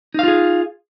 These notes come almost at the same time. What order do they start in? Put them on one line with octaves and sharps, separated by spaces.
D#4 F5 F4 G#4